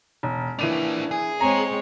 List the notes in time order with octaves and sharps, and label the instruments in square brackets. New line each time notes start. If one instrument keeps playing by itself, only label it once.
[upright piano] E1
[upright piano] E3 D#7 F7 [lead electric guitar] A#3 D4
[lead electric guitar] G#4
[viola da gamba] G#3 C4 C#5 [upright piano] A#5